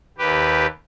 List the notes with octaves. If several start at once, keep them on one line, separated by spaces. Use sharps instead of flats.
D#2 G4 B4